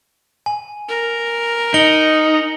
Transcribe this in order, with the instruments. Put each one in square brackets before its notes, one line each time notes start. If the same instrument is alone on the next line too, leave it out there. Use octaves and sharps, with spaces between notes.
[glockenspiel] G#5
[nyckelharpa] A#4
[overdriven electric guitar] D#4 [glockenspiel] C#7 F#7 G7